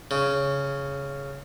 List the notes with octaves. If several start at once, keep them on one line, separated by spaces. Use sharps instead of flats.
C#3